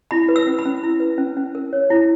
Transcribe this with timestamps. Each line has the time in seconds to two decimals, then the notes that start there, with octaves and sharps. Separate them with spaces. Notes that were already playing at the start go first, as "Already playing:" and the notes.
0.11 E4 B5
0.29 B4
0.36 E6
0.47 C#4
0.59 B5
0.65 C#4
0.83 E4
1.00 B4
1.18 C#4
1.37 C#4
1.55 A#4
1.73 C#5
1.90 E4